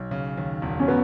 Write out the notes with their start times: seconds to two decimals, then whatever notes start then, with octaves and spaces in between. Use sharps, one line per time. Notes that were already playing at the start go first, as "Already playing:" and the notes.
Already playing: B1
0.11 C#3
0.38 D#2
0.62 E1
0.80 C#4
0.88 F#3 B3